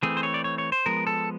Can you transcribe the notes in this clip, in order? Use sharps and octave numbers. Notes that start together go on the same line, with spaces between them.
E3 A3 C4 G#4
C5
C#5
D5
C#5
C#5
C5
F3 G#3 B3 A#4
A4